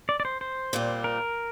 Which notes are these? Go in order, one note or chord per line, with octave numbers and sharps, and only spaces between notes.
D5
D5
C5
C5
A#2 G3 C4
A#4